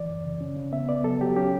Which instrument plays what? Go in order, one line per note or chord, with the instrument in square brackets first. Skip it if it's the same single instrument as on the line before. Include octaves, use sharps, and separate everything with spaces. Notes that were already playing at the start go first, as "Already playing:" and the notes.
Already playing: [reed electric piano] E3 D5
F#2
C#3
C#4
C#3
B3 E5
B3 D5
F#3 A4
F#3 G4
C#4 G4